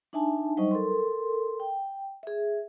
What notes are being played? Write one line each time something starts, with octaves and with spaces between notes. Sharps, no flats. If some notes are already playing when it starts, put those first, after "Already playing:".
D4 D#4 E5 G#5 A5
F#3 G3 D#4 C5 D#5 C#6
A4 A#4 C6
G5
G#4 E5